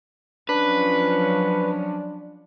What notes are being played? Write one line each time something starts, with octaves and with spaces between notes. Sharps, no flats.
F3 F#3 C#4 D4 B4